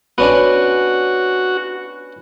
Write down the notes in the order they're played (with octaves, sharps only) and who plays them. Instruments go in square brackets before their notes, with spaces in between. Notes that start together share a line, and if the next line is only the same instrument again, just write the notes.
[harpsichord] B3 C#4 D4 [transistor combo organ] F#4